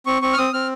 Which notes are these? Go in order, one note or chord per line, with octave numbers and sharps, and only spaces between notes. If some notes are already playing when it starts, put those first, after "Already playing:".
C4 C#6
C4 C#6
F6
C4 D#6
C4 F6